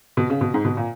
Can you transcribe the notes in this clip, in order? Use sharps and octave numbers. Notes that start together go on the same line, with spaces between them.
B2
C#3
B2
G#2
B2
A#2